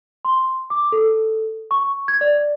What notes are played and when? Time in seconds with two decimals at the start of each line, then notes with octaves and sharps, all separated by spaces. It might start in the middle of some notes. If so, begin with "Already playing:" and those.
0.25 C6
0.70 D6
0.92 A4
1.71 C#6
2.08 G#6
2.21 D5